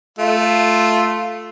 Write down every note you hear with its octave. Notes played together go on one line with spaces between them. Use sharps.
A3 F4